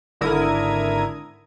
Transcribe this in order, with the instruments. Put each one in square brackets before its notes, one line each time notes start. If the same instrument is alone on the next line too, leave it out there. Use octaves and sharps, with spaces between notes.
[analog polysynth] G#1 D3 E4 A#4 D#6 G#6